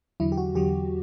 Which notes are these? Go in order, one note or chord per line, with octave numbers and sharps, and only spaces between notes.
E2 D3 F#3 E4
G4
F#4
E2 D3 F#3 G4